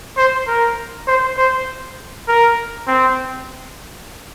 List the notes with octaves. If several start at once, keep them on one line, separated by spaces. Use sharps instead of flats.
C5
A#4
C5
C5
A#4
C4